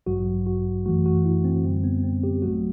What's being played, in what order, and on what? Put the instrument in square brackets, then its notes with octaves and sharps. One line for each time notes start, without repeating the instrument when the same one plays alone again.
[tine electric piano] A1 G2 F#3 F#4
F#4
F#2 E3 A3 F#4
F#4
E4
C4
F#2 D3 G3 C4
B3
C4
G4
A1 A2 F#3 A3 F#4